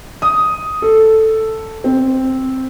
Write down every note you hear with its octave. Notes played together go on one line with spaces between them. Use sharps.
D#6
A4
C4